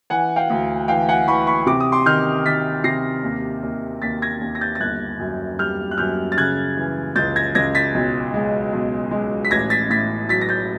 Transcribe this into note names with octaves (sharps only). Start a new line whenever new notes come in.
E3 F#5 G#5
F5 G5
D2
E3 F5 G5
F#5 G#5
E3 B5 C#6
B5 C#6
C3 D6
D#6
C6 D6
D#3 F6 G6
D#3 A6 B6
C3 A#6 C7
D#2
D#2
D#2 A6 B6
G#6 A#6
D#2
A#6
G6 A6
A6
G1 F#6 G#6
F#2
G3 F6 G6
F#6
F#2 F6 G6
A6
C#3 F#6 G#6
E3
C#2 G6 A6
G#6 A#6
C#2 G#6 A#6
A6 B6
B1
G#3
B1
G#3
B6
A1 G#6 A#6
A6 B6
A2 A6 B6
F#3 A6 B6
A#6
G6 A6